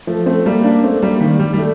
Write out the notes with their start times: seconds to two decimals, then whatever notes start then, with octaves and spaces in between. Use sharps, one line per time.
0.07 F3 A3
0.26 A3 C4
0.46 G3 A#3
0.64 A#3 D4
0.83 A3 C4
1.02 G3 A#3
1.20 D#3 G3
1.39 D#3 G3
1.53 G3
1.58 A3